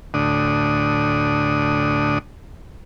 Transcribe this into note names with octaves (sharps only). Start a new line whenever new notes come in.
D2 A2 D4 D#6